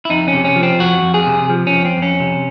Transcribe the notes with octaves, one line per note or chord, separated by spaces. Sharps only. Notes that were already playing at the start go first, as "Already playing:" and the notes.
E4
F2 D#4
C#4
C3
C#4
F3
C4
F2 F#4
F2
G#4
C3
F3
C#4
F2
C4
F2
C#4
C3